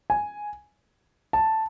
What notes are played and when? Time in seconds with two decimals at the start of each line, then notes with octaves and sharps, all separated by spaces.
0.10 G#5
1.33 A5